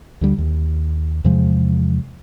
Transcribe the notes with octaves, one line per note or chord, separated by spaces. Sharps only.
D2 D3 G3
D#2
E2 C3 F3 G#3